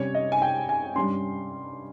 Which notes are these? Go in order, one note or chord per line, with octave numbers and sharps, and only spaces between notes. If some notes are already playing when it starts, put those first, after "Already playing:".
Already playing: C3 G3 C#4 C#5
D#5
G#5
G5
G#5
G2 G3 C#4 C6